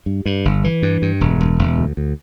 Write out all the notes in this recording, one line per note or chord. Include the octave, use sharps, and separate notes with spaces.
G2
G2
G1
E3
G2
G2
E1
E1
E1
D2
D2